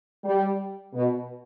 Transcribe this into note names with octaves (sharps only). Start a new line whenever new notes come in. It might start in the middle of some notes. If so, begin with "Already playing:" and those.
G3
B2